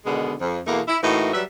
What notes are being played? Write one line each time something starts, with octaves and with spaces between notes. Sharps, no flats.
B2 D3 D#3 G#3 B3
F2
E2 B2 A3 A#3
E4
A2 E3 A#3 D#4 F#4
F#3 G3 B4 E5